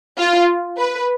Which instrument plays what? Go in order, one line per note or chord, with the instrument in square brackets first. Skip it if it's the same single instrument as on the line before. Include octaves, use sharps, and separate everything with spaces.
[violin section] F4
B4